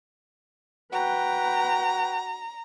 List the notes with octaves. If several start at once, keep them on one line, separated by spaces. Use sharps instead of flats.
F#4 B4 G5 A#5